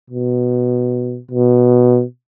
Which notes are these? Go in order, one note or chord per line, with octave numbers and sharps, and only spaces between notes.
B2
B2